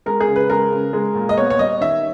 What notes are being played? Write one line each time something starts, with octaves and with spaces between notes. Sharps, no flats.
G#3 A#4
G#4
C#3
B4
G#3 A#4
C#3
G#3
A#2
D#5
B3 C#5
C#5
G3 D#5
D#3 E5